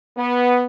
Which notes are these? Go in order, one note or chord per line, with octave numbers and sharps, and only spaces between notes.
B3